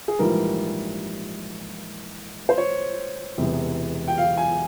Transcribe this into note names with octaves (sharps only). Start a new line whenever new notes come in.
G#4
A#1 G#2 E3 G3 A#4
C5
C#5
E1 E2 C3
G5
F5
G#5